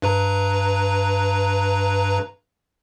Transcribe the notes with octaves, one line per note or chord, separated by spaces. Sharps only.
G2 B4 A#5